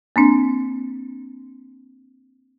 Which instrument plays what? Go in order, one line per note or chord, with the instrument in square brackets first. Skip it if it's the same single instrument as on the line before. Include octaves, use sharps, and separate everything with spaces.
[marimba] A#3 C4 D4